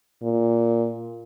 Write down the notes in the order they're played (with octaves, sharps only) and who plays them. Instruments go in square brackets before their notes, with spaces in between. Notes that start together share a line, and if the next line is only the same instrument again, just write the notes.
[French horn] A#2